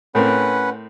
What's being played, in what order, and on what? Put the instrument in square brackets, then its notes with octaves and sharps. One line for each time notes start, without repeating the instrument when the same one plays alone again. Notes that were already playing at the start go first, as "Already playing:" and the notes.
[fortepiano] A2 C4 A#4 [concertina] C#4 B4 F#5